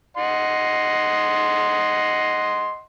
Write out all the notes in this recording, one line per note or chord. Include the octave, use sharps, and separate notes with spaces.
D#5 F#5 C6